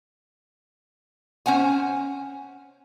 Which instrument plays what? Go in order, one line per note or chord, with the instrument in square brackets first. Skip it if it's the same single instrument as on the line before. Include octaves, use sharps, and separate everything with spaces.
[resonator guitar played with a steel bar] C#4 C5 F#5 G#5